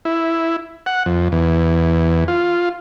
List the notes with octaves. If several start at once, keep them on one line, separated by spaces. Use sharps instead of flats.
E4
F#5
F2
E2
F4